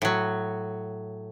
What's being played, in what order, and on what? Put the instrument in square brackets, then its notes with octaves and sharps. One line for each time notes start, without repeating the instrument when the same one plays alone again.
[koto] A2 F#3